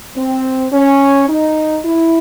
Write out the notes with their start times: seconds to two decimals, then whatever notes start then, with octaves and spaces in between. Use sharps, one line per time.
0.16 C4
0.73 C#4
1.29 D#4
1.85 E4